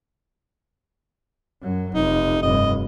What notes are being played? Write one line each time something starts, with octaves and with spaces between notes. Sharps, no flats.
F#2 F#3
F1 D#4
F1 G2 D#5